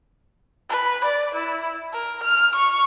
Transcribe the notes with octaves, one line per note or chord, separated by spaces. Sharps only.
B4
D5
E4
A#4
F6
C#6